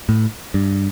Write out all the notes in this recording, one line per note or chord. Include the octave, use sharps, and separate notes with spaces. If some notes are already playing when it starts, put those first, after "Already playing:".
A2
G2